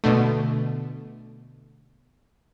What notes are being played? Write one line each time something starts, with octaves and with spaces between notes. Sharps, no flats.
B2 D3 A3